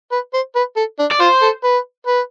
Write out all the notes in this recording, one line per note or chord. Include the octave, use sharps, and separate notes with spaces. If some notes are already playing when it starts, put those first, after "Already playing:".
B4
C5
B4
A4
D4
D5
F4 C5
A4
B4
B4